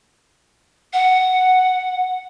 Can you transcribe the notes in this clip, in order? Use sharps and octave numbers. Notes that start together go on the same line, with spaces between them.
F#5